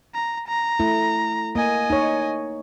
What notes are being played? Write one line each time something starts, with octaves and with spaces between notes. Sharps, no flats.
A#5
A#5
A3 E4
A#3 D#5 G#5
D#4 C#5